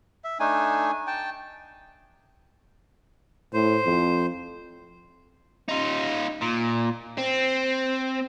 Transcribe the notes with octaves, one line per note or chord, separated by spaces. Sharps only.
E5
A3 D4 D#4 G#5
G5 A5
A2 C5
F2
D#4 F4
A#2
C4